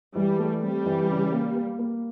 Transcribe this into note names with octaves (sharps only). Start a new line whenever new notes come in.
E3 G3
A3
G3 C4
E3
C#3
A#3
A#3
A#3